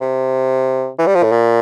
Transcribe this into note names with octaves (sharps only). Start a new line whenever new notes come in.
C3
E3
G3
F3
A2
A#2